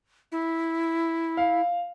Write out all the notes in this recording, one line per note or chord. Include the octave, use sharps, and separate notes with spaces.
E4
F5